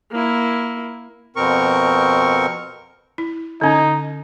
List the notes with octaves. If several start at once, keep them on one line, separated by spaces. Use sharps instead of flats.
A#3 E4
F2 B2 C4 A#4 C#6
E4
D3 C#4 D#4